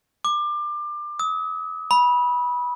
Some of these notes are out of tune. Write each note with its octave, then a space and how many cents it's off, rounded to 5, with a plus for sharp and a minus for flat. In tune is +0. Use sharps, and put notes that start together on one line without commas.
D6 +25
D#6 +45
B5 -20